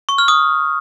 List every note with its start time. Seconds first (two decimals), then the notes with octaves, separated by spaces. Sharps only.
0.09 C#6
0.18 F6
0.28 D#6